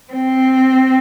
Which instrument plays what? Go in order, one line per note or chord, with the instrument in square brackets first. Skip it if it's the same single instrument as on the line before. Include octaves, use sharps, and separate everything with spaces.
[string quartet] C4